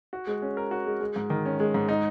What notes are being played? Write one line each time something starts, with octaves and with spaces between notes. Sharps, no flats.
F#4
G#3
C#4
A#4
F#4
G#3
G#3
G#2
D#3
C#4
G#3
G#2
D#4